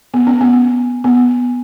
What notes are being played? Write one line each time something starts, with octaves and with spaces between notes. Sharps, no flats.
B3
C#4
B3
B3